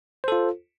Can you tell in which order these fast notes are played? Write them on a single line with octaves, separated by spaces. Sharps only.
C5 A4 F4